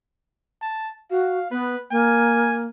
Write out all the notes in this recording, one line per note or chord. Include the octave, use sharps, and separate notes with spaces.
A5
F#4 F5
B3 B4
A#3 G#5